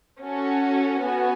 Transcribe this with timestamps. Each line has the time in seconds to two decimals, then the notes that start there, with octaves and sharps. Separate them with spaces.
0.22 C#4 F#4 A4
1.02 B3 F#4 G#5